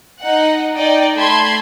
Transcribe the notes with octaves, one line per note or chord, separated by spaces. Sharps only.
D#4 F#5
D#4 D5 D#5 G5
A3 A5 B5 C6 G#6